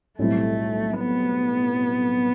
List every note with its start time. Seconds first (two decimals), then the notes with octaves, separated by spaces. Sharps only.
0.18 B1 A2 G3 A3 C4 E4
0.98 B3